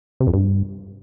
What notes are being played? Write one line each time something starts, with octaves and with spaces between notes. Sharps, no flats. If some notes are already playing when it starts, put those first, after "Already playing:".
C3
F2
G2